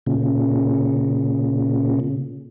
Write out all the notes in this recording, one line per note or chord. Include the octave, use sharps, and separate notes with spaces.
A#2 C#3